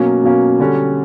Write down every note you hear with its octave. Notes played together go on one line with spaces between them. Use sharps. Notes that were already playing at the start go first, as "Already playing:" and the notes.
Already playing: B2 F#3 A#3 C#4
B2 F#3 A#3 C#4
D3 G3 C#4 F#4